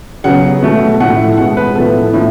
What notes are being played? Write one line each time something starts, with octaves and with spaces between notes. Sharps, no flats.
C#3 F#3 B3 F#5
B2 A3
A2 F3 A3 F#5
B2 G#3 B3 F#5
B4
A2 F3 B3 A4
A2 F3